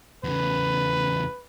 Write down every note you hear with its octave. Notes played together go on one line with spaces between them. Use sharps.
E2 C#3 B4